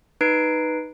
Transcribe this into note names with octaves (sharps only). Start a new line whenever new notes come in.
D#4 B4 C7 D7